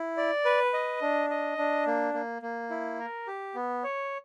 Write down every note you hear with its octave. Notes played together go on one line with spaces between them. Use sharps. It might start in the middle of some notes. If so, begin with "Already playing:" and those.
Already playing: E4
D5
B4
D#5
D4
D#5
D4
A#3
A#3
A#3
E4
A#4
G4
B3
C#5